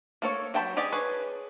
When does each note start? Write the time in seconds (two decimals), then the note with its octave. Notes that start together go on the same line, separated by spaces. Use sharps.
0.22 A#3 A4 C#5
0.54 F#3 G5 A5 B5
0.77 D#4 G4 G#4 D5 G#5
0.92 G#4 B4 C#5 G#5